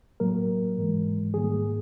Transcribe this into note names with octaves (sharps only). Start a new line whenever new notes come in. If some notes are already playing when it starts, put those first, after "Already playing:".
A2 F#3 A#3 A#4
G#2 E3 G#3
G#2 D#3 G3 A#3 G#4